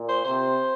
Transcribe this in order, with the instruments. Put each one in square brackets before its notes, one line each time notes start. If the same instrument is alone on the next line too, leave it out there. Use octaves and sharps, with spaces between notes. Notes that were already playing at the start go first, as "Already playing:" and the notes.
Already playing: [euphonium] A#2
[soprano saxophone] C5
[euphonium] C3 [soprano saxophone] C5